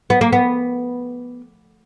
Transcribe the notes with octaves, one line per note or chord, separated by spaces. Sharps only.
B3
A#3
B3